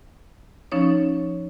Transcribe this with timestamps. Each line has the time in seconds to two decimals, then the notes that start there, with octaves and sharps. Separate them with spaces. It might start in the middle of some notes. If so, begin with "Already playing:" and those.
0.72 F3 C#4 D#4 C#5